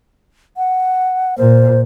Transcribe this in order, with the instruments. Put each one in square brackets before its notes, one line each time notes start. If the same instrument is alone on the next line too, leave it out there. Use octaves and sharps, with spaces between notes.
[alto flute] F#5
[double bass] A#2 [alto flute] C5